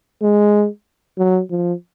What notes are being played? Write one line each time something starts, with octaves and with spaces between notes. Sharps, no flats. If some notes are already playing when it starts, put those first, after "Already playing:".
G#3
F#3
F3